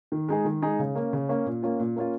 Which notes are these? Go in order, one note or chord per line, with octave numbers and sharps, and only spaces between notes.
D#3
G#3 D#4 G#4
D#3
G#3 D#4 G#4
C#3
A#3 C#4
C#3
A#3 C#4
A#2
A#3 C#4 F4
A#2
A#3 C#4 F4